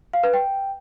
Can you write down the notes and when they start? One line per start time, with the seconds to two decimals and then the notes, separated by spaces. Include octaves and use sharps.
0.13 F5
0.23 B4
0.33 G5